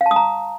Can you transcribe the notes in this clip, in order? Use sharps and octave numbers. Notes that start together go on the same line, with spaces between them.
F5
A5
D#6
A#5